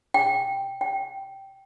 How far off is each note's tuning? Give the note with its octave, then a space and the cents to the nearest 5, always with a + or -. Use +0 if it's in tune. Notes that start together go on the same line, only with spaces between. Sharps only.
G5 +0
G5 -10